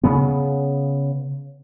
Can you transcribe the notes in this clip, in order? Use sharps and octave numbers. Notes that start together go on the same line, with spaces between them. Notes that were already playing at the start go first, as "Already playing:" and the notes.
C#3 B3